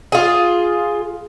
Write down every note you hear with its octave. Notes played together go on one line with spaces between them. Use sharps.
F4 G#4